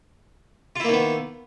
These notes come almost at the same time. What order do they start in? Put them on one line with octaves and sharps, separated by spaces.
F4 E4 A#3 D#3 B3